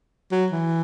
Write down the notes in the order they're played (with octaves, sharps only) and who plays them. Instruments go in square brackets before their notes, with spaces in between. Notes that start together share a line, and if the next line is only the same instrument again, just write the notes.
[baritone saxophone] F#3
E3